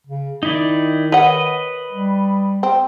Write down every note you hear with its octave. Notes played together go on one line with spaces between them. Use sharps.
C#3
D#3 D#4 E4 D5
B4 C#5 D#5 F#5
G3
C4